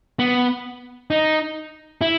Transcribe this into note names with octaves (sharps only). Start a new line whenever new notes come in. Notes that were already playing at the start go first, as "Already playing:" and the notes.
B3
D#4
E4